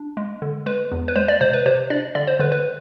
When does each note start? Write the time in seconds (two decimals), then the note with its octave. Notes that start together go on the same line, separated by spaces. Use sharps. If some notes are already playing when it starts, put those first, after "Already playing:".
Already playing: D4
0.17 G#3
0.42 D3
0.66 G#3 B4
0.92 E2
1.08 B4
1.16 G#3 C5
1.28 D5
1.41 C3 C5
1.53 B4
1.66 C3 C5
1.90 D4 D5
2.15 D3 D5
2.27 C5
2.39 D3 B4
2.52 B4